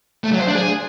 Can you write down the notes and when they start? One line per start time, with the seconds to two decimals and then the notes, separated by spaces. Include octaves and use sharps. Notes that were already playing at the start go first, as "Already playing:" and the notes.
0.24 A3
0.32 F#3
0.40 C5
0.47 D4
0.55 G#4